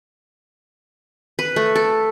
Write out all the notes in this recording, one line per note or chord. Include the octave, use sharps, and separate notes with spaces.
B4
A3
A4